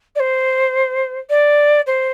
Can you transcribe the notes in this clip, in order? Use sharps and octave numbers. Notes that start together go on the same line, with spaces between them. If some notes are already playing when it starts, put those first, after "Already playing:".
D5
C5
D5
C5